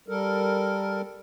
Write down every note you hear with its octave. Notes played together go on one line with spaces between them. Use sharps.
G3 A4 A#4